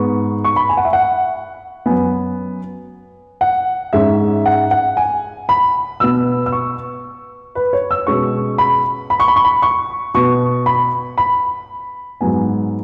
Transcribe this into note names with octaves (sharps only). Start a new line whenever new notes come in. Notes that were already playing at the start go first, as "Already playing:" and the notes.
Already playing: G#2 G#3 B3 C#6
C#6
B5
G#5
F#5
E5
F#5
F#2 F#3 B3 G#5
F#5
G#2 G#3 C#4 E5
F#5
F#5
G#5
B5
B2 B3 E6
E6
C#6
B4
C#5
E6
B2 G#3 C#4 C#6
B5
B5
C#6
B5
C#6
B5
C#6
B2 B3 C#6
B5
B5
G#2 F#3 B3 G#5